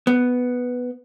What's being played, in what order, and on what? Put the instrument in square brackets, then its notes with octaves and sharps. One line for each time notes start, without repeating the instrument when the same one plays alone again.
[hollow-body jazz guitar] B3